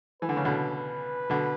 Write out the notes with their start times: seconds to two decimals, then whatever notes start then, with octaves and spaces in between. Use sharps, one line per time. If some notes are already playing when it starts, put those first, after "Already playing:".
0.22 E3 B4
0.29 D3
0.37 C#3
0.45 B2 D3
0.75 B4
1.30 B2 D3